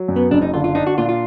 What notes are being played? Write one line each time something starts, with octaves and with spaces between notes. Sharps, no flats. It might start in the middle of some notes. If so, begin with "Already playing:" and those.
Already playing: F#3
F#2
B3
F#1 D4
D#4
D3 F4
F4
D4 D#4
F#4
A#2 F4
F4